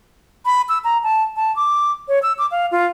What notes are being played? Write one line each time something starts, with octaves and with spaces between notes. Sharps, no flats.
B5
E6
A#5
A5
A5
D6
C#5
E6
D6
F5
F4